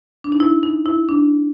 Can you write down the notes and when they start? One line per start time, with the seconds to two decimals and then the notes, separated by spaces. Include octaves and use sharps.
0.24 D4
0.32 D#4
0.40 E4
0.63 D#4
0.86 E4
1.09 D4